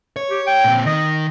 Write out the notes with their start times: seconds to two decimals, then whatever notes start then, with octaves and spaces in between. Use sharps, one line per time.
0.16 C#5
0.30 G4
0.47 G5
0.64 A#2 C4
0.86 D#3 D#5